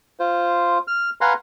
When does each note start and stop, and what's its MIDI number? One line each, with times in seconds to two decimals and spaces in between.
0.20 0.78 65
0.20 0.78 72
0.87 1.10 89
1.21 1.33 71
1.21 1.33 77
1.21 1.33 78
1.21 1.33 80
1.21 1.33 82
1.21 1.33 84